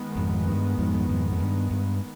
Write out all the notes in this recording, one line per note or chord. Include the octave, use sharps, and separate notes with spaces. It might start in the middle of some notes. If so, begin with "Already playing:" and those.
Already playing: D#3 G#3 B3
F2 G#2
G2
F2 G#2
F2 G#2
F2
G2
G2